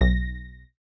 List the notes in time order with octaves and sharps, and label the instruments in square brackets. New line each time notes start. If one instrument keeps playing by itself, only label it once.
[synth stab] B1 A#6